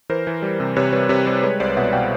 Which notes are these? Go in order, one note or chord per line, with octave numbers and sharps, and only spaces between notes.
E3 A#4 C5
E3
G3
C3
C3 B4 C#5
G3 B4 C#5
C3 B4 C#5
G3 C5 D5
G#3 B4 C#5
C2 C5 D5
B2 E5 F#5
B2 F5 G5